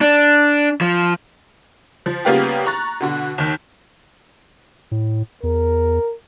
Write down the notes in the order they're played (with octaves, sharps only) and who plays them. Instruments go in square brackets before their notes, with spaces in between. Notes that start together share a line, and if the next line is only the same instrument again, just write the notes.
[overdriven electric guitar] D4
F3
[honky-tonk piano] F3
C#3 G3 A#3 B3 F4 G4
A#5 C#6 F#6 A6
B2 D3 F#4
D#2 D#3
[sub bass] A2
[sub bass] E2 [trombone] A#4